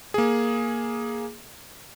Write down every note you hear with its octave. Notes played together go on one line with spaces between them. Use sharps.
A#3 G#4